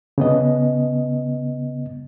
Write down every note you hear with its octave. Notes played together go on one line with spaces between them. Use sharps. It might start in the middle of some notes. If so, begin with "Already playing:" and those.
C#3 B3 D#5